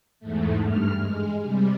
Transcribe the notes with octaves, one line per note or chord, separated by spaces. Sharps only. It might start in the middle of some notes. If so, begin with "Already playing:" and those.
E2 G#2 A3
G2 F6
G#3
C3 G3